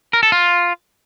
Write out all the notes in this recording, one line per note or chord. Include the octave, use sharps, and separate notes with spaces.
A#4
A4
F4